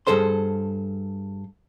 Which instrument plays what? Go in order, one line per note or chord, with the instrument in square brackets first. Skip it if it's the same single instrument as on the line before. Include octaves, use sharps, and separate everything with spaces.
[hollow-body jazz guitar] G2 G#3 G#4 A4 C5 C6